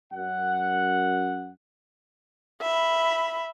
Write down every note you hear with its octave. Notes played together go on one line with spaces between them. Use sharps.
F#2 F#5
E5 B5